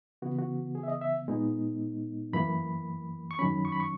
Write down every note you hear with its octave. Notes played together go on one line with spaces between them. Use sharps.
C#3 E3 B3 F#4
F#4
G#4
E5
D#5
E5
A#2 G#3 B3 D#4
F#2 E3 A#3 B5
C#6
F#2 D#3 F#3 C#4 B5
C#6
B5
C#6